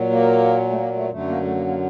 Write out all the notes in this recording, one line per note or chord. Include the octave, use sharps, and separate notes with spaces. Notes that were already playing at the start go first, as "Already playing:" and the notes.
Already playing: A#2 F#3
A#3
A3
A#3
A3
F#2 D3 F#3 A3
A#3
A3
A#3
A#3